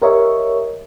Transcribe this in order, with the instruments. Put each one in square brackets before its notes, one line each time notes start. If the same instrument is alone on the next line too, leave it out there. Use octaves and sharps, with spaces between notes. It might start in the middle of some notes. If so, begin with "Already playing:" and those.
[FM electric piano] G4 A#4 C#5 D#5 E5 C#6